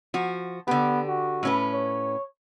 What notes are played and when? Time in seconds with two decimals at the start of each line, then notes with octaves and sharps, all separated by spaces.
0.14 F3 F#4
0.68 D3 B3 G4
1.08 F#4
1.43 A2 C#4 B4
1.73 C#5